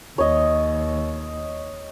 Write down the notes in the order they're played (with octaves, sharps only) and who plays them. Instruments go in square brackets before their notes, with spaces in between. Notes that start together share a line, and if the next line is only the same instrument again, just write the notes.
[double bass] D#2 [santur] C#5 D#5